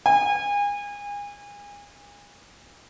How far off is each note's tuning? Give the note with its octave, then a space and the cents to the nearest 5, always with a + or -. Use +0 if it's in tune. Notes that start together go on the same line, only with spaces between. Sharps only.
G#5 -35